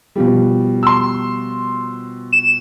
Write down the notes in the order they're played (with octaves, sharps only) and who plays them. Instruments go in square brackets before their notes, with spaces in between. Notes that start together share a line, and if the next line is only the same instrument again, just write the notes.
[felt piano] B2 F3 G3
[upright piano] C6 E6
[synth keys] E7